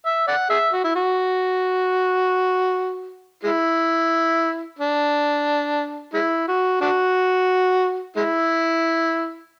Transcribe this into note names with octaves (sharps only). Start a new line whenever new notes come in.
E5
D5 F#5
G#4 E5
F#4
E4
F#4
G#3 E4
D4
G#3 E4
F#4
D4 F#4
G#3 E4